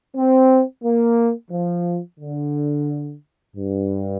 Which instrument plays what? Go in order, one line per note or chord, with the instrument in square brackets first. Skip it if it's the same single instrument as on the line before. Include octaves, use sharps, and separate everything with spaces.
[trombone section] C4
A#3
F3
D3
G2